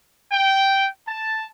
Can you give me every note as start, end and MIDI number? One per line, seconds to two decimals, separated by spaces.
0.32 0.86 79
1.07 1.45 81